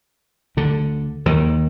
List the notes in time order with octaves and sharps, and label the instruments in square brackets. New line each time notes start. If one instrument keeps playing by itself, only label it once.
[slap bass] D2 D3
D#2 D#3